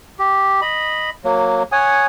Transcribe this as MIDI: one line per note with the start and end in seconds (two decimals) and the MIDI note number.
0.19 0.61 67
0.62 1.10 75
0.62 1.10 83
1.24 1.63 54
1.24 1.63 58
1.72 2.07 73
1.72 2.07 78
1.72 2.07 80
1.72 2.07 87